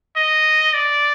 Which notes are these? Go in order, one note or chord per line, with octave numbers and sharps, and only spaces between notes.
D#5
D5